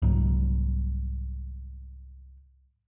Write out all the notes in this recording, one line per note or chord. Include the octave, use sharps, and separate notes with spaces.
C2 G#2 F#3